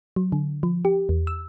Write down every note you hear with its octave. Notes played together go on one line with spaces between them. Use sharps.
F#3
D3
F3
G4
E2
E6